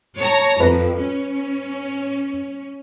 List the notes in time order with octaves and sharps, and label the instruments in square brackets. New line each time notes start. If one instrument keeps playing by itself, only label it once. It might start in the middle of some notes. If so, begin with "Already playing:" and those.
[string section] C#5 A5 A#5
[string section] F2 [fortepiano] B4
[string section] C#4